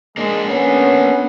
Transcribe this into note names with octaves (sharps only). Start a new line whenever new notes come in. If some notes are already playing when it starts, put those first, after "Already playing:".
G#3 A#3 D4
B3 C#4